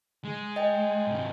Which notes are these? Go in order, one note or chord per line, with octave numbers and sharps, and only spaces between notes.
G#3
D#5 G5 G#5
G#2 C3